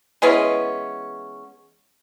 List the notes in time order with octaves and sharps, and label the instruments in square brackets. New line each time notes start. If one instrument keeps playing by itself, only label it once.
[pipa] E3 G#3 B3 C#4